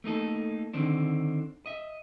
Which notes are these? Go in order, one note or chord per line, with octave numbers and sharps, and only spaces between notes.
A3 A#3 D#4 A4
D3 D#3 C4 D4
D#5 E5